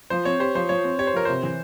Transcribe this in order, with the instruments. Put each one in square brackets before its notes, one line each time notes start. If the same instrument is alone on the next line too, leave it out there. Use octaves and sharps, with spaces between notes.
[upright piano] F3 [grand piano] C5
[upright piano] C4 [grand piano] C#5
[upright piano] G4 [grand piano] C5
[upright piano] F3 [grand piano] C5
[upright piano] F3 [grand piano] C#5
[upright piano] C4
[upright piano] G4 [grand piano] C#5
[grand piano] C5
[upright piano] F3 [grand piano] A#4
[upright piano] C3 [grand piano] C5
[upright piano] E3